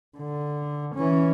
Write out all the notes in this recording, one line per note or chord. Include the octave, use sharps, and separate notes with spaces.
D3
E3 C#4